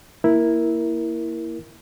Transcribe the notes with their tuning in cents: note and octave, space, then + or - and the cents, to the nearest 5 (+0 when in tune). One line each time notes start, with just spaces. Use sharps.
A#3 -5 E4 +0 A#4 +5